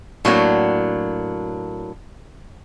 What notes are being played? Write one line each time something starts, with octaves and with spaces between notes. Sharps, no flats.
A2 F#3 A#3 D4